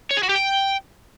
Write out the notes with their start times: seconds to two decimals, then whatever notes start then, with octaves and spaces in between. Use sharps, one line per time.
0.11 C#5
0.17 G#4
0.23 F#4
0.29 G4
0.36 G5